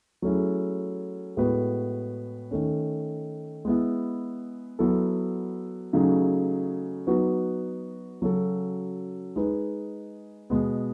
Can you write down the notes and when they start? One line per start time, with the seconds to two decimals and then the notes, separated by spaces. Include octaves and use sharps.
0.22 F#3 A3 C#4 E4 G#4
1.37 A2 G#3 B3 F#4 B4
2.51 D#3 A3 C#4
3.65 G#3 B3 E4
4.79 F#3 B3 E4 A4
5.93 C#3 F#3 A3 D#4 G#4
7.07 F#3 B3 D#4 F#4 B4
8.22 C#3 F#3 C#4 F#4 A4
9.36 G#3 D#4 G#4 B4
10.50 B2 G#3 B3